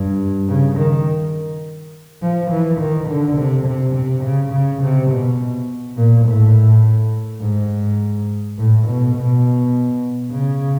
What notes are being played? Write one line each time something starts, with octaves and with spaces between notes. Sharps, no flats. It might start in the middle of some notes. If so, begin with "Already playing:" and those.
Already playing: G2
C#3
D#3
F3
E3
D#3
D3
C3
C3
C3
C#3
C#3
C3
B2
A#2
A2
G#2
A2
B2
B2
C#3